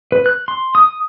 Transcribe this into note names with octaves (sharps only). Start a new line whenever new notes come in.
B4
F#6
C6
D#6